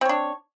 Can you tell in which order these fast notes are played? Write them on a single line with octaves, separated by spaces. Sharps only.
C4 C#5 D4